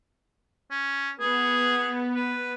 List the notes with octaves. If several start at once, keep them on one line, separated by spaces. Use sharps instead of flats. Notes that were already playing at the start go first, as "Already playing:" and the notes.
C#4
B3 G#4
B4